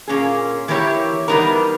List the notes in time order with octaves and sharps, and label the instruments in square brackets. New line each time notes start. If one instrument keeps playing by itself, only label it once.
[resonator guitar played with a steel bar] A#2 A#3 C#4 G#4
E3 A#3 E4 G4 C#5
E3 G3 B3 D#4 A#4